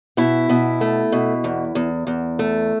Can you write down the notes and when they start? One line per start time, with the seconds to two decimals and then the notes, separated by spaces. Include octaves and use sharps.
0.17 B2 E4
0.49 B2
0.81 A3
1.12 B2
1.44 E2
1.75 E2
2.07 E2
2.39 A3